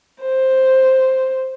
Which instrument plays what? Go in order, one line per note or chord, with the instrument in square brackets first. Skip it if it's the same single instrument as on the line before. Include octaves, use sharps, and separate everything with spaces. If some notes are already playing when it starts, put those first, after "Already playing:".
[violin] C5